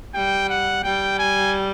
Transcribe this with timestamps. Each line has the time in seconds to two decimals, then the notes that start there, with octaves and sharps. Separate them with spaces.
0.14 G3 G5
0.49 F#5
0.83 G3 G5
1.19 G#5